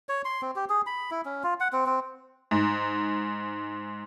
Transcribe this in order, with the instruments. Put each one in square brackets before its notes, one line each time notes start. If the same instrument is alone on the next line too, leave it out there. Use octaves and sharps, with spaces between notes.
[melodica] C#5
C6
C4
G4
G#4
B5
E4
C#4
F4
F#5
C4
C4
[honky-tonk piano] G#2